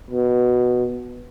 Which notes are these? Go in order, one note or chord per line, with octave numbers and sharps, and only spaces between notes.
B2